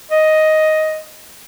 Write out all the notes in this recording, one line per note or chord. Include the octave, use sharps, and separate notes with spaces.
D#5